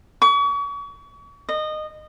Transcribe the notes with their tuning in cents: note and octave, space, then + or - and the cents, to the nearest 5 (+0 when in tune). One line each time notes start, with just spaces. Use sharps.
C#6 +40
D#5 -20